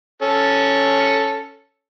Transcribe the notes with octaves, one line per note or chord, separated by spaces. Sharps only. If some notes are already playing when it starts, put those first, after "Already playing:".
C#4 A4